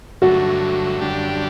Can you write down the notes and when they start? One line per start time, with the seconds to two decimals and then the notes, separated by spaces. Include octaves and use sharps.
0.21 G2 D3 F#3 A3 F#4
1.01 F#2 D3 G3 D4 G4